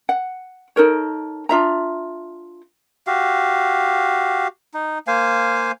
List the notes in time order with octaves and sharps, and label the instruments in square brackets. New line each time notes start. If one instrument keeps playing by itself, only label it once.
[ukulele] F#5
D#4 A4 A#4 C#5
D4 F4 E5 A#5
[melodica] F#4 G4 F5
D#4
A#3 C5 F5 G#5